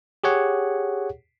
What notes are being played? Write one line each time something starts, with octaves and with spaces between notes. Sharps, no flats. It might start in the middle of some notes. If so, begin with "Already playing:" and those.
G4 G#4 C#5 F#5